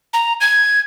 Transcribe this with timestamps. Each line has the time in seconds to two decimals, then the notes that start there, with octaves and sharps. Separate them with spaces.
0.13 A#5
0.41 G#6